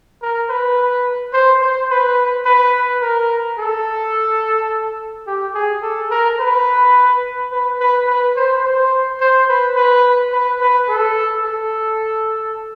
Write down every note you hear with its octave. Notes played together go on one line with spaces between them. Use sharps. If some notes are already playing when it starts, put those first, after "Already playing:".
A#4
B4
C5
C5
B4
B4
A#4
A4
G4
G#4
A4
A#4
B4
B4
B4
B4
C5
C5
C5
B4
B4
B4
B4
A4
A4